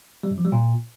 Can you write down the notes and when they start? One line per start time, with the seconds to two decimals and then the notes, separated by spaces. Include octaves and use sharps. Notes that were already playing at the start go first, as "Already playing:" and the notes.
0.23 G3
0.31 F#2
0.38 F3
0.45 G3
0.52 A#2